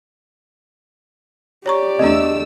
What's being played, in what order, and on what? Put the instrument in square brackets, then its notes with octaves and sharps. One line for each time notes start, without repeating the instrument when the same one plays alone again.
[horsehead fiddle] G4 D5 [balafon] C#5 A#5 C#6
[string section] E2 A3 E6 [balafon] C4 D4 [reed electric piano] D#5